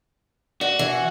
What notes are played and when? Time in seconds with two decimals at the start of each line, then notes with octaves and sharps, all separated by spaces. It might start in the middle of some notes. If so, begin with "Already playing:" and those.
0.61 F#4 D5
0.79 E3